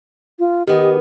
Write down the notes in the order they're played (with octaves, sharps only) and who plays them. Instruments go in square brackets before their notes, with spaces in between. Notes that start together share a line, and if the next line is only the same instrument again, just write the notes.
[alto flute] F4
[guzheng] D#3 B3 [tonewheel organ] G4 [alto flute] D#5